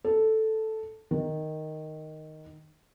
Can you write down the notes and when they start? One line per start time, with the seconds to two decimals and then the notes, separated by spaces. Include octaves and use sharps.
0.04 A4
1.11 D#3